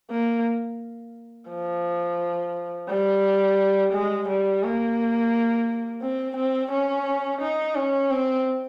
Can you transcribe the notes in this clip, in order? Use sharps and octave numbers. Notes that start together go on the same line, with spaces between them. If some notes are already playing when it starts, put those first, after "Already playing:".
A#3
F3
G3
G#3
G3
A#3
C4
C4
C#4
D#4
C#4
C4